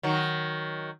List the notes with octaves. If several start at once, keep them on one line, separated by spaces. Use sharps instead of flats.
D#3 F#3